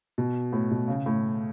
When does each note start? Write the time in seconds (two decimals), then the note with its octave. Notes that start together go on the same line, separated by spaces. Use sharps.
0.18 B2
0.53 A2
0.71 B2
0.88 C#3
1.06 A2